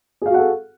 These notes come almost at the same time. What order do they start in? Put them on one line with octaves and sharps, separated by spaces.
G#4 F5 F#4 F#5 A4